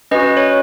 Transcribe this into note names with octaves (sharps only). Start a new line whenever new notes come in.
C#4 F#4 B4 D#5
B4
C#5